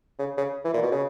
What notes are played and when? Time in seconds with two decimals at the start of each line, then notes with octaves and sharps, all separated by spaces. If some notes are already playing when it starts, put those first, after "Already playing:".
0.19 C#3
0.37 C#3
0.65 E3
0.73 A#2
0.83 B2
0.91 C#3